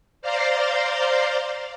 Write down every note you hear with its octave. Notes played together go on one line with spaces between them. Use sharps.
C5 D5 F5 A#5 C6